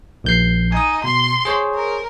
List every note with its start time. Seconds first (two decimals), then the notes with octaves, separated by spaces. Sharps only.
0.24 A#1 G6 C7
0.72 D#4 G#5 D#6
1.04 B2 C6
1.45 G#4 C5 C#5
1.75 A#4